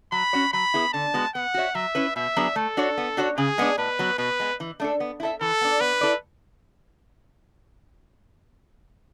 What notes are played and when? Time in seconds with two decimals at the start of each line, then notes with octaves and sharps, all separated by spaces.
0.12 F#3 B5
0.33 C#4 F#4 C#5
0.53 F#3 B5
0.74 B3 E4 G#4
0.93 D3 A5
1.14 G#3 B3 F#4
1.35 B3 F#5
1.54 F#4 C#5 E5
1.75 F#3 E5
1.95 C#4 E4 B4
2.16 B2 E5
2.36 F#3 B3 D4 G#4
2.56 A3 A4
2.77 D4 F#4 C#5
2.98 B3
3.17 D4 F#4 C#5
3.38 C#3 G#4
3.58 G#3 B3 D4
3.78 A2 B4
3.99 F#3 B3
4.18 B2 B4
4.40 G#3 B3
4.60 E3
4.80 A3 D4 A4
5.00 B3
5.20 E4 A4 E5
5.41 E3 A4
5.61 B3 D4
5.81 B3 B4
6.01 E4 A4 D5